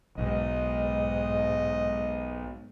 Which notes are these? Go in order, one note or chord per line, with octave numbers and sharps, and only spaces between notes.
B1 G#2 D#5